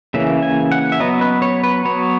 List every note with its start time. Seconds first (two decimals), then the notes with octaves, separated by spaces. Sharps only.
0.14 C#3 E3 A#3 C#4 E5
0.43 G#5
0.72 F#5
0.92 E5
1.00 F#3 B3 D#5
1.21 B4
1.42 C#5
1.64 B4
1.85 F#3 B3 C#5